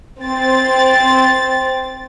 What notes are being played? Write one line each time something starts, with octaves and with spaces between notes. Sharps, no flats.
C4 A6